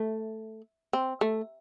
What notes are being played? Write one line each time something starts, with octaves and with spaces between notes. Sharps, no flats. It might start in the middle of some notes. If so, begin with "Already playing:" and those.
Already playing: A3
C4
A3